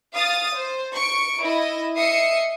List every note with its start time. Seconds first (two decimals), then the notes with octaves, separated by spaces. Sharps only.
0.14 F5 D#6 A6
0.55 C5
0.93 C#6 C#7 D7
1.42 E4 D#5
1.97 D#5 E5 D#6 C7 C#7